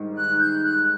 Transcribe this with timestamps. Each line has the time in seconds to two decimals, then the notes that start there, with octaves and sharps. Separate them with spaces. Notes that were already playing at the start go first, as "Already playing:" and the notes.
Already playing: G#2 D#3 G3
0.16 F#6
0.40 G6
0.62 F#6